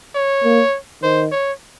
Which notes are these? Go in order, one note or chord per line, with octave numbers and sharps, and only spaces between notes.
C#5
A#3
D#3 C5
C#5